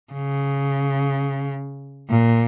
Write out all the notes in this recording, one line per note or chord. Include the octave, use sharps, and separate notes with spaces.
C#3
A#2